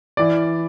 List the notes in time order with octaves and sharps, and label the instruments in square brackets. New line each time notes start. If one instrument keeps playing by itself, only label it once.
[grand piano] E3 D5